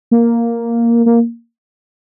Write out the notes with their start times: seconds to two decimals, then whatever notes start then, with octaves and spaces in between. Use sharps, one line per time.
0.11 A#3
1.06 A#3